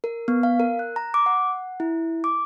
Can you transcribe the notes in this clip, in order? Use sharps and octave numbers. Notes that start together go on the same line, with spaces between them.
A#4
B3
F5
A#4
F#6
A#5
D6
F#5
E4
D6